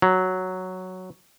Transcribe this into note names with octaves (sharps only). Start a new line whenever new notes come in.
F#3